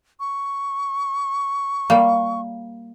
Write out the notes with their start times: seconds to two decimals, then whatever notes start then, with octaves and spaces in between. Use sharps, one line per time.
0.20 C#6
1.90 G3 A#3